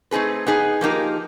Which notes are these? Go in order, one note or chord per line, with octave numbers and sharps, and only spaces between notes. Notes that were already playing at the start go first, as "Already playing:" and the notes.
A3 C4 D#4 G#4 B4
B3 D#4 G#4
F3 A#3 D#4 G4 A#4